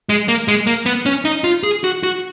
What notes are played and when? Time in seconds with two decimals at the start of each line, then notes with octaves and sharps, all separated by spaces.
0.09 G#3
0.28 A#3
0.48 G#3
0.67 A#3
0.86 B3
1.06 C#4
1.25 D#4
1.44 F4
1.63 G#4
1.84 F#4
2.03 F#4